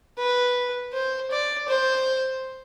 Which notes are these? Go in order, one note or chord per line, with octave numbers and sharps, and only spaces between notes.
B4
C5
D5
C5